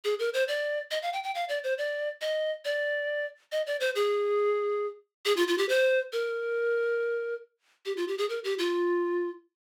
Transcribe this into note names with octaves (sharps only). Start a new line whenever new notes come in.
G#4
A#4
C5
D5
D#5
F5
G5
G5
F5
D5
C5
D5
D#5
D5
D#5
D5
C5
G#4
G#4
F4
F4
G4
C5
A#4
G4
F4
G4
G#4
A#4
G4
F4